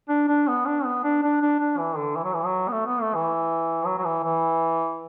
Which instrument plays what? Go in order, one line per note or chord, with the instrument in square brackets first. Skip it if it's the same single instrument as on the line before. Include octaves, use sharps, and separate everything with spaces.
[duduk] D4
D4
B3
D4
B3
D4
D4
D4
D4
E3
D3
E3
F#3
E3
F#3
B3
A3
B3
A3
E3
F#3
F#3
E3
E3